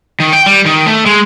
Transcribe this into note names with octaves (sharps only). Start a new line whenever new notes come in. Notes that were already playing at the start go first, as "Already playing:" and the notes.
D#3
G5
G3
D#3
A3
G#3